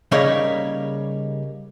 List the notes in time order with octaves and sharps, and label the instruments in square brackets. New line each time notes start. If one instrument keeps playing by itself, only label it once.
[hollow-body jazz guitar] C#3 G3 A#3 D#4 A#4 C#5